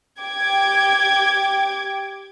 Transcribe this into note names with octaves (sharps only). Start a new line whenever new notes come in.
G4 G5 D6 G#6